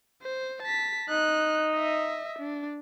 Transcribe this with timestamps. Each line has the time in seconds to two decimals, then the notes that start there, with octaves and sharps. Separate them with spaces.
0.22 C5
0.62 A5 B6
1.09 D#4 F#6
1.73 D#5 E5
2.39 D4